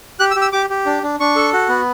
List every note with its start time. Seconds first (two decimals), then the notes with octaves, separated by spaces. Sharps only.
0.19 G4 F#6
0.31 E6
0.36 G4
0.42 E6
0.52 G4 D6
0.70 G4
0.86 D4
1.03 D4
1.20 D4 C#6
1.36 A4
1.53 F#4
1.69 B3